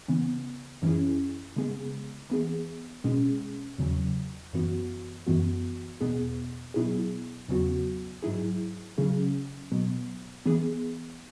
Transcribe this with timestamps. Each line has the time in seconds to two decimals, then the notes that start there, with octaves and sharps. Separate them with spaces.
0.08 C#3 E3 B3
0.82 F#2 E3 C#4 E4 G#4
1.56 C#3 G#3 B3 G#4
2.30 E3 B3 G#4
3.04 B2 G#3 C#4 G#4
3.78 E2 C#3 F#3
4.53 F#2 E3 B3 F#4
5.27 F#2 E3 B3 F#4
6.01 E2 B2 B3 G#4
6.74 B2 F#3 B3 E4 G#4
7.48 E2 C#3 F#3 B3 F#4
8.23 G#2 F#3 E4 G#4
8.98 C#3 F#3 C#4 G#4
9.72 B2 F#3 B3
10.46 E3 B3 G#4